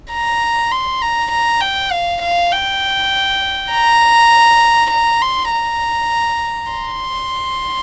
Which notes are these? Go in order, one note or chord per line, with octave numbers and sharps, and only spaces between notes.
A#5
C6
A#5
A#5
G5
F5
F5
G5
A#5
A#5
C6
A#5
C6